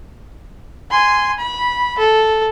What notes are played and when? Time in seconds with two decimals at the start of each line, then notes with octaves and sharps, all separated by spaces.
0.91 G#5 C6
1.38 B5
1.99 A4